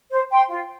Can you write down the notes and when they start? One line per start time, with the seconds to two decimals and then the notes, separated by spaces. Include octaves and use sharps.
0.11 C5
0.31 G5 C6
0.49 F4